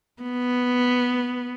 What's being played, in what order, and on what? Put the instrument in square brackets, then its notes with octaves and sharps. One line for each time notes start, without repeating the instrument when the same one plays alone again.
[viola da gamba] B3